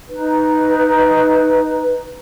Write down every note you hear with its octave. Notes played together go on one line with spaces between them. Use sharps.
D#4 B4